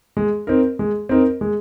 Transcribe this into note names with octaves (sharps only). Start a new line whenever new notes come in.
G#3
C4 D#4 A#4
G#3
C4 D#4 A#4
G#3